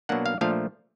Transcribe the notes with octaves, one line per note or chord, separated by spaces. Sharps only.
B2 F#3 A#3 D4 F#5
F5
A#2 F3 A3 D4 F5